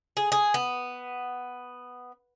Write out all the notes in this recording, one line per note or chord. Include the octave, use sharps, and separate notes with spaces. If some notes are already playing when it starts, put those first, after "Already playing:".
G#4
G#4
B3